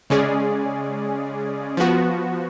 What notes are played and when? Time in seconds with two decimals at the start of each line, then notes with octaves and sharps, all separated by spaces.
0.10 C#3 G#3 C#4 G#4 D5
1.77 F3 B3 F#4